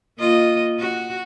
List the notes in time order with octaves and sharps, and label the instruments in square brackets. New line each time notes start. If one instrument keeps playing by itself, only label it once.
[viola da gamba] A#3 F4 D#5
F#4